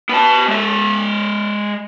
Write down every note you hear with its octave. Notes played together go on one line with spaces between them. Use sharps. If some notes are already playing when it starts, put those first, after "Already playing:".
B3 A5
G#3 E5